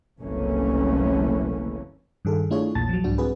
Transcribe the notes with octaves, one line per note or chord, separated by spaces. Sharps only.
F#1 C2 E3 A3 A#3 C#4
G2 D#3 G#4 A4
A3 D4 E4 F4 G#4 C#5
A#1 E2 A#2 A5 A6
F3 F#3
C2 G#2 D4 F#4
C4 F#4 G#4 B4